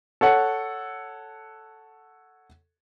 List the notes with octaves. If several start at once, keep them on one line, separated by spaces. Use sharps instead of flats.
A4 C#5 F#5